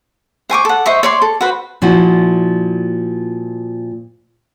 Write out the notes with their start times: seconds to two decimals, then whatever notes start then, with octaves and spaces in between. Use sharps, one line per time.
0.50 C5 G#5 C#6 D6
0.65 A4 F#5
0.86 C5 D#5 E5 C#6
1.03 C#5 D5 C6
1.22 A4
1.41 F#4 B4 C5
1.82 A#2 F3 E4 F#4